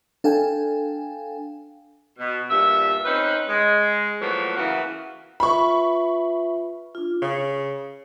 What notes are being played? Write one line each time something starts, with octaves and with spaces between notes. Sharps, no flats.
D4 A4 F5 G5 G#5
B2
G2 A#2 E5
C4 C#4 D#4 B4
G#3
A2 F3 F#3 A#3 B3
C#3 E3 A#3 B3 F#4
F4 B4 E5 B5 C#6
D4 F4
C#3